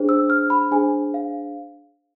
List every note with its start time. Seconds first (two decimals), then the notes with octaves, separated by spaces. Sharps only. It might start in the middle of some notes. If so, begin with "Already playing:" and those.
Already playing: D4 G#4 C5
0.09 E6
0.30 F6
0.50 B5
0.71 D4 G#4 C5 G#5
1.14 F5